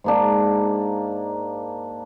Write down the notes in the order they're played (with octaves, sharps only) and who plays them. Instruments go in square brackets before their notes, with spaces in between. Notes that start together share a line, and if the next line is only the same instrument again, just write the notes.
[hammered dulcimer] G#2 A#3 D4